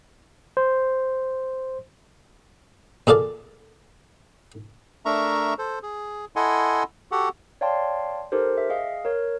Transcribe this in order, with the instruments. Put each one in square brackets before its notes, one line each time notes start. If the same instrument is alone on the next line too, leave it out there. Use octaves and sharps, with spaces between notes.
[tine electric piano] C5
[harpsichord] A#2 G#4 A4 D5 F5
[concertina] A3 D4 A#4 E5 A#5 C#6
A4 C5
G#4
E4 A4 D#5 F#5 G#5 C6
F#4 G4 A4 F#5
[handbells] C#5 D5 F5 G5 A5 C6
D#4 G4 A4 A#4 C5
E5
G#4 D#5 F5
A#4 C#5